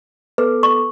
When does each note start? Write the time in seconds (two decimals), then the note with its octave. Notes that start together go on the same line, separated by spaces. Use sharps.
0.38 B3 A4 B4 D6
0.63 C#6